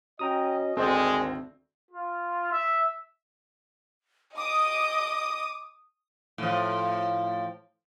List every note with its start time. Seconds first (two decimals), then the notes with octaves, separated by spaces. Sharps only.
0.19 C#4 F#4 D#5 G5 A#5 D#6
0.77 G#1 D2 G#3 C4 A#4 C5 D5
1.91 F4
2.52 E5
4.37 D#5 D6 D#6
6.38 A2 F3